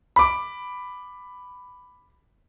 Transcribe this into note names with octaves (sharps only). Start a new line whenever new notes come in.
B5 D6